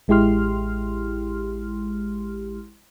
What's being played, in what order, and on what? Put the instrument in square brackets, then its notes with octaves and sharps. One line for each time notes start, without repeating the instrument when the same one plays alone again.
[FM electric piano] A1 G#3 E4 G4 C6 F6